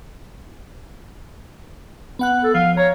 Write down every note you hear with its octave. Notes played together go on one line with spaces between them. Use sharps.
B3 F#5 F#6
A4
F3 F5
C#5 A#5